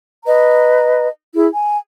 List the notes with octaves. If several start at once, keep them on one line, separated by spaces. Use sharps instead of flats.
B4 D#5 A#5
E4 G#4
G#5